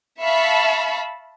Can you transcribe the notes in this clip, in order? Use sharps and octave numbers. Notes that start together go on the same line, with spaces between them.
E5 F5 A5 B5 C#6